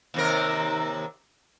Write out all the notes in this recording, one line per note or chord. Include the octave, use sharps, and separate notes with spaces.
D#2 C3 A#4